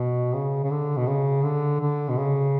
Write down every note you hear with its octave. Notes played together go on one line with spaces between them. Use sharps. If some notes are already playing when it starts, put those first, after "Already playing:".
Already playing: B2
C#3
C#3
D3
B2
C#3
D3
D3
B2
C#3